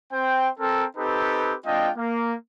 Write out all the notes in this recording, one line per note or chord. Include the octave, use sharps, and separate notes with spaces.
C4 C5 G5
C4 A4 A#4
C4 D#4 G4 A4 B4
G#3 C4 D4 F4 D#5 G5
A#3